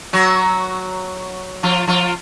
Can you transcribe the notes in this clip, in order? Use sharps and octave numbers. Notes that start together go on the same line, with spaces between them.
F#3 F#4
F3 F4
F3 F4